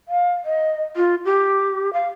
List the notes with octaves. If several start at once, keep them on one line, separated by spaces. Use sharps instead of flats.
F5
D#5
F4
G4
F5